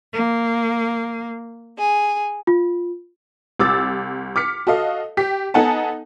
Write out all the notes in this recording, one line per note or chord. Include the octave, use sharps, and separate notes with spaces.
A#3
G#4
F4
C2 D6 E6 A6
D6 F6 B6 C#7
F#4 A4 D#5 F5
G4 B6
B3 D#4 A4 F#5 G#5 A5